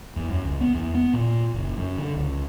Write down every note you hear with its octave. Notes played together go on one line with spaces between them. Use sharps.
E2
F#2
C#2
B3
E2
B3
A#2
F#1
F#2
D3
C#2